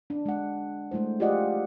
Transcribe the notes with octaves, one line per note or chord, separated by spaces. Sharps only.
D4
G#3 F#5
G#3 A3 E4 C5
F4 G4 G#4 D5 D#5 F#5